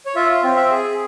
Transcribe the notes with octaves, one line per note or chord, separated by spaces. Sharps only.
C#5
F4 E5
C4
E5
G#4